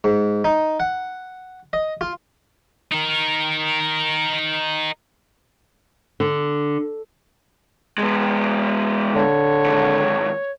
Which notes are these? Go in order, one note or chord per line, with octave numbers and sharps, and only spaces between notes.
G#2
D#4
F#5
D#5
F4
D#4 A#4
D3
G#3 B3
D3 C#5
D#2 G#2